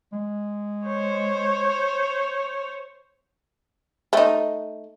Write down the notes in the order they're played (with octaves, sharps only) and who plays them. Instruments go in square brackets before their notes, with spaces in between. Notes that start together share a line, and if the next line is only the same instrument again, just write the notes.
[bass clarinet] G#3
[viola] C5 C#5
[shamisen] A3 D#4